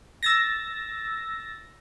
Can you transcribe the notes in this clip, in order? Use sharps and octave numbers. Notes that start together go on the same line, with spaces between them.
E6 A6 A#6